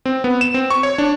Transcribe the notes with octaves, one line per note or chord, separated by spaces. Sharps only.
C4
B3
E7
C4
C#6
C#5
D4